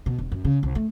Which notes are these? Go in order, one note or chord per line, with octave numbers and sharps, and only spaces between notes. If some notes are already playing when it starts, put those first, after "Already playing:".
B2
E1
F#2
C#3
C2
A3